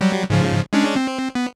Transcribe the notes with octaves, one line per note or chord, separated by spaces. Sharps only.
F#3 G3
G#2 C#3 F3
G#3 C#4 D4
C4
B3